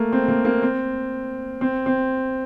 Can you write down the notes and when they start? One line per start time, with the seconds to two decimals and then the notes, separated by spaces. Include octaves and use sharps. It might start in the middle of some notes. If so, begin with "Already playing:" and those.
Already playing: A3 A#3
0.12 C4
0.28 A#3
0.45 A#3
0.62 C4
1.61 C4
1.86 C4